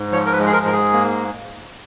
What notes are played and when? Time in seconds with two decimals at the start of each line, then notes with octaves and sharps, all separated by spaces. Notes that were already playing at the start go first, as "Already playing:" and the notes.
Already playing: G#2
0.12 F3 C#5
0.26 A#4
0.33 B4
0.39 G#3
0.47 G#4
0.53 A#4
0.66 G#2 A#4
0.73 G#4
0.93 A#3